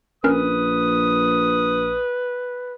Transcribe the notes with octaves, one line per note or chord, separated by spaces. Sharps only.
A#1 C#4 A#4 B4 D#6